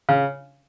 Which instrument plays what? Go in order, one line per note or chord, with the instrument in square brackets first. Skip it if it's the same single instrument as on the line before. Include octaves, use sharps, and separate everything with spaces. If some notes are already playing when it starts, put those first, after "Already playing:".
[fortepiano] C#3 [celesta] F5